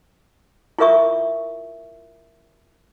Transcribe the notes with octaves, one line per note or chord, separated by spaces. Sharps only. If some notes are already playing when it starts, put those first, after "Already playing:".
E4 F4 A#4 E5 C#6 D#6